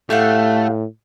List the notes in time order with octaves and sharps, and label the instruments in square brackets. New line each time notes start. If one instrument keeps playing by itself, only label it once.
[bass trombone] A2 [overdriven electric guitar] A3 [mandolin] G4 F5 F#5